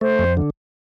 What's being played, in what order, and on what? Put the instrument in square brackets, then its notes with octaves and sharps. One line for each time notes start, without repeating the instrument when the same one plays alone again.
[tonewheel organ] A3 [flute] C5
[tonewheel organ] F2
D3